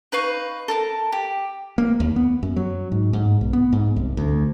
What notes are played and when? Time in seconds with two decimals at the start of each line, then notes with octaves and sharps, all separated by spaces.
0.12 D#4 B4 F5 C#6
0.68 A4 A#4 A5
1.12 G4
1.78 A#3
2.00 D#2
2.16 B3
2.43 F#2
2.56 F#3
2.92 G#2
3.13 G#2
3.41 B1
3.53 B3
3.72 G#2
3.96 C2
4.17 D2